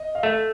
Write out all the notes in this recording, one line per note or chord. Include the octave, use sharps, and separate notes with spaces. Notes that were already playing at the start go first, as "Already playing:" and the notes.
Already playing: D#5
F5
A3 E5